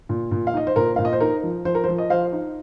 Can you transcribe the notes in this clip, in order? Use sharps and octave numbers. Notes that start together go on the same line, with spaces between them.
A#2
A#2
F5
D#4 D#5
C5
A#2 A#4
A#2 F5
D#5
C5
D#4 A#4
F3
F3 C5
A#4
C5
F3
D#5
F3 C5 F5
D#4